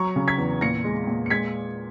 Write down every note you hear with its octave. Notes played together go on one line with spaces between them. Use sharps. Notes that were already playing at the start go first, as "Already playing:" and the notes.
Already playing: F#3 A#5 C#6
C#3
G#6 B6
E2
A#2 A#6 C#7
G#3
A#2
C#7
G#3 G#6 B6